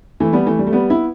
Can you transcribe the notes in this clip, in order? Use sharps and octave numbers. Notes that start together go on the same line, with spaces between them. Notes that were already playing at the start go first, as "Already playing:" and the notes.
E3 A3
G3 B3
E3 A3
G3
A3
G3 B3
B3 E4